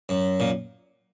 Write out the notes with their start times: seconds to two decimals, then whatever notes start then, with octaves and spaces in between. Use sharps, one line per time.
0.09 F#2
0.40 A#2